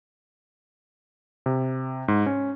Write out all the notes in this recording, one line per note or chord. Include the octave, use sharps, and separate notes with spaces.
C3
G#2
C#4